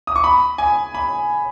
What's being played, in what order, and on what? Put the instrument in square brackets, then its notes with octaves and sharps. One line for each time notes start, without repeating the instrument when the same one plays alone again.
[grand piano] D#6
C#6
B5
G#5
B5